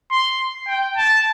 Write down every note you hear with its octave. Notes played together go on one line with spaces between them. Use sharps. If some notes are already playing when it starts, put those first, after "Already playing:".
C6
G5
A5